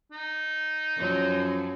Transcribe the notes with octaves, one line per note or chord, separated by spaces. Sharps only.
D#4
F#2 F3 F#3